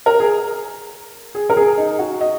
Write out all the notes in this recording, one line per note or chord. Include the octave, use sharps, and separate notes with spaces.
A#4
G#4
G#4
A#4
G#4
D#4
F#4
D#5